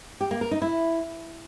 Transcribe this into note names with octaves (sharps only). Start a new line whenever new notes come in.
G4
A#3
A#4
D#4
E4